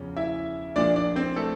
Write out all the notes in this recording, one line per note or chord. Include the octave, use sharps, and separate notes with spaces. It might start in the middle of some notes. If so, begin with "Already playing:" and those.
Already playing: E2 C#3 F3 C#4
E4 E5
A#1 A#2 F3 D4 D5
D4 D5
C4 C5
A3 A4